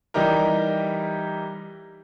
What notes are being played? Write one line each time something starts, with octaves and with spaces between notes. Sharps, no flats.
E3 G3 D#4 G4 A#4